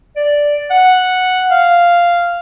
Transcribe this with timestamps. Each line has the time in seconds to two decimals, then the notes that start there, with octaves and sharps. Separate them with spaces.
0.16 D5
0.70 F#5
1.50 F5